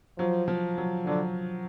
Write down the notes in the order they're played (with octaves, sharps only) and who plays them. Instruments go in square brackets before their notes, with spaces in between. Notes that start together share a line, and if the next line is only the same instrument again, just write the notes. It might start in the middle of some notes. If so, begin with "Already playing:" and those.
[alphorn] F3 [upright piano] F#3
[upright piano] F3
F#3
[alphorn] D3 [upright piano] F#3